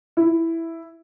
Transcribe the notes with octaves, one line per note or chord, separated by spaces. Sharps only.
E4